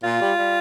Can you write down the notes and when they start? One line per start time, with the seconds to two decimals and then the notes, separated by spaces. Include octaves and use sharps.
0.04 A#2 F4
0.21 G3
0.37 G3